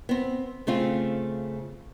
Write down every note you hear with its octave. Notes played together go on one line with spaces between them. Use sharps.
B3 C4
C#3 A3 C4 F4